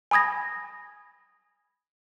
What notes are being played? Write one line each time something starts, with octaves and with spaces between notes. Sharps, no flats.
G#5 B5 D#6 G#6 A#6